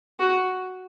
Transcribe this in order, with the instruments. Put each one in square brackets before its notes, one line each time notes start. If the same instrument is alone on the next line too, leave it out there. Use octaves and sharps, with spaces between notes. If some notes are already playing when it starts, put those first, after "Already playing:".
[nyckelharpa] F#4